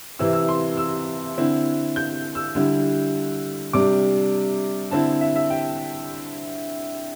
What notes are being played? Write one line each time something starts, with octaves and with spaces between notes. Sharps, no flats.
C3 E3 C4 E4 E6
E6
C6
E6
D3 C4 E4
G6
E6
D3 G3 E4
C3 G3 D4 D6
D3 C4 E4 A5
E5
E5
G5